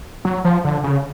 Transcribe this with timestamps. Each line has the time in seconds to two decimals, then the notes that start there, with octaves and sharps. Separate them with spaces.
0.25 F#3
0.44 F3
0.64 D3
0.84 C#3